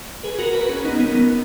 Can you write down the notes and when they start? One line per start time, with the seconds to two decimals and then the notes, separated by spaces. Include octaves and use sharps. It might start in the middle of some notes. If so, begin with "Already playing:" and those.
0.23 G#4 B4
0.39 F#4 A#4
0.54 G#4 B4
0.69 C#4
0.85 B3 D#4
0.99 B3 D#4
1.15 B3 D#4